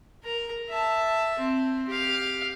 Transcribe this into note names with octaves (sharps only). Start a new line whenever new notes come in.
A#4 A#5
E5 A5
C4
G4 F5